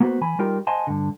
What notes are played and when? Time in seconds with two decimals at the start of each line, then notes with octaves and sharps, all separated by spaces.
0.01 A#3 B3 F#4 B4 C5
0.21 E3 G#5 B5
0.39 G3 D#4 F4 G4 A#4 G5
0.67 C5 D#5 F#5 G#5 A5 C6
0.87 G2 D3